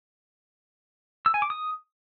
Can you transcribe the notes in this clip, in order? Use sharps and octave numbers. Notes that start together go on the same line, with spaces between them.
E6
G#5
D6
D#6